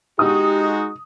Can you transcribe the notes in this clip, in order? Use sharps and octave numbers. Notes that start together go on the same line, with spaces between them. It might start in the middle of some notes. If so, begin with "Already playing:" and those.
G#3 D#4 F#4 G4 D#6